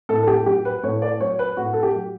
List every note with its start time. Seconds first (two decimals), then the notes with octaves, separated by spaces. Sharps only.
0.09 A2 A4
0.23 A4
0.27 G4
0.46 F#3 G4
0.65 B4
0.83 A2 C#5
1.02 D5
1.20 F#3 C#5
1.39 B4
1.57 A2 F#4
1.73 A4
1.83 G4
1.95 F#3